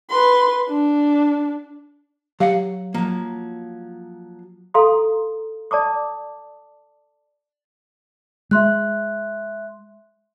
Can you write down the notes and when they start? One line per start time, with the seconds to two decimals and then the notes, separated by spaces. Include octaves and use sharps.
0.10 B4 C6
0.69 D4
2.40 F#3 G4 F5 F#5
2.94 F3 F#3 A#3
4.74 A4 F5 A#5 C6 D#6
5.71 D5 A5 D6 D#6
8.51 G#3 E5 C6 F#6